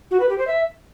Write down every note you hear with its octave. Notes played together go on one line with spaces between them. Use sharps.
F#4
B4
G4
C5
E5